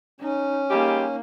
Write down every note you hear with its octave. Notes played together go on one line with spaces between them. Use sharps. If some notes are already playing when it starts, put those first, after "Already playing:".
C#4 D#4
G3 G#3 A#3 D#4 G4